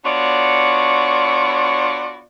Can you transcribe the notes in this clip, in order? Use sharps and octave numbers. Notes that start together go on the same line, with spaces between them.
B3 D4 F4 F#4 C#5 D5